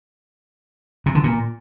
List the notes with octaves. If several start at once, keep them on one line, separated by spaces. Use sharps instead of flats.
C3
D3
A#2